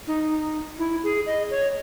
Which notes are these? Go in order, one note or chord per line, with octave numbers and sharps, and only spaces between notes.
D#4
E4
G#4
D#5
C#5